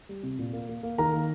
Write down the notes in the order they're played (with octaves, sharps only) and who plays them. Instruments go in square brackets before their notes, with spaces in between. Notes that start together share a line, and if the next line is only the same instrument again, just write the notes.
[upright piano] G3
C3
A#2
A#3
A#3
A#3
D#3 A#4 A#5
A#3